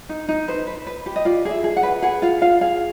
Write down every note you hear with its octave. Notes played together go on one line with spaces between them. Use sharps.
D#4
D#4
B4 C5
B4
B4
G4
D#5
F4 D5
G#4
E5
G#4
F#5
B4
G#4 F#5
F4 F5
F4 F5
G#4 F5